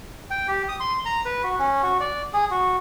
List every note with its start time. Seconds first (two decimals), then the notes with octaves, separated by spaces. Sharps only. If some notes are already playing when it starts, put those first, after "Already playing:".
0.30 G5
0.48 G4
0.69 D#6
0.80 C6
1.05 A#5
1.25 B4
1.43 F#4
1.59 C#4
1.83 F#4
2.00 D5
2.33 G#4
2.51 F#4